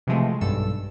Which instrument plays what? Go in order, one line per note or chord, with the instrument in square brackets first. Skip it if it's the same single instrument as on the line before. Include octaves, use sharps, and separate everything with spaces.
[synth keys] C3 E3 F3 G#3 A3 C4
B1 G2 A4 E6